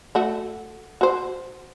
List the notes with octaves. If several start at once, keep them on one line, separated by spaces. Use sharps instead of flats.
A3 F#4
F#4 C5